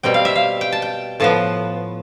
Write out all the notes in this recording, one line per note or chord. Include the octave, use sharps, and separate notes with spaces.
B2 G3 C4 G5
F5
E5
F5
G5
A5
G5
A2 F3 B3 A5